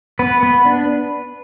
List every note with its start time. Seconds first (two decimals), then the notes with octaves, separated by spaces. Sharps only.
0.19 B3 B4
0.43 B3
0.65 D4